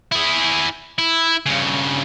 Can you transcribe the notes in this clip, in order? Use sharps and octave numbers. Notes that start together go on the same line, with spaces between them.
E4 G#4
E4
G2 C#3